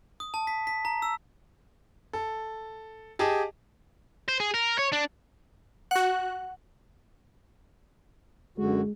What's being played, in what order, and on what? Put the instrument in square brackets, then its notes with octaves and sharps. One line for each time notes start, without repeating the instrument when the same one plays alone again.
[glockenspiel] D#6
A5
B6
B6
A#5
E6
[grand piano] A4
G4 G#4 D#5 A5
[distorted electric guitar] C5
G#4
A#4
C#5
D4
[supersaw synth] F#4 F#6 [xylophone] F#5
[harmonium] F#2 D3 F#4 [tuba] G#3